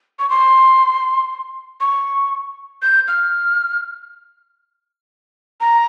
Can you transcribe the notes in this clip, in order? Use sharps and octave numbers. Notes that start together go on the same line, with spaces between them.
C#6
C6
C#6
G6
F6
A#5